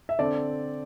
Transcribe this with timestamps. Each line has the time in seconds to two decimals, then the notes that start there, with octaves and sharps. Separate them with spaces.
0.09 E5
0.19 D3 C4 A4 D5